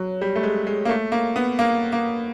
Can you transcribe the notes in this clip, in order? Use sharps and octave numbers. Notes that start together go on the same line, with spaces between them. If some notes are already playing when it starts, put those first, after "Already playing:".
Already playing: F#3
G3
A3
G#3
G#3
A#3
A3
A#3
B3
A#3
A#3